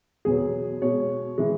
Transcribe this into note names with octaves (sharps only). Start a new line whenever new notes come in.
E2 B2 F#3 G#4
B2 G#3 C#5
E3 G#3